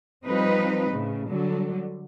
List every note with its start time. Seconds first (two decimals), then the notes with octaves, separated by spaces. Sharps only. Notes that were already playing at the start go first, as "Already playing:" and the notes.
0.24 F3 G3 C4 D#4 B4 D#5
0.90 A2 C#3
1.27 D3 F#3 G3